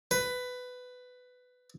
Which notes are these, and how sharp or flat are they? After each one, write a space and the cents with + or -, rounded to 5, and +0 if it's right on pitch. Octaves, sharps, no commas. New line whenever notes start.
B4 +15